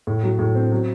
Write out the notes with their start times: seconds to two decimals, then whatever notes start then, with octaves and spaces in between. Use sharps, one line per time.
0.07 A2
0.23 F#3
0.39 A2
0.55 C4
0.72 F#3